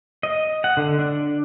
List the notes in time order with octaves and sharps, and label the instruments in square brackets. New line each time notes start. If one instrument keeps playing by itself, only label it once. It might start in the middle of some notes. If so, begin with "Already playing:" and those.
[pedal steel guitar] D#5
F#5
D3
D4